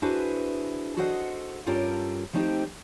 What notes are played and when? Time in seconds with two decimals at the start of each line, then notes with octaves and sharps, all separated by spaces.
0.02 D4 E4 F#4 G#4 B4 C5
0.97 F#4 G#4 A4 C5 D#5 F#5
1.66 G2 C#4 F4 G4 A4 A#4
2.33 F3 A3 C4 D#4 G4